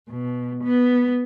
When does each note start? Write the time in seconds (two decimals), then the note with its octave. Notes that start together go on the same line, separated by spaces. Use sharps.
0.11 B2
0.63 B3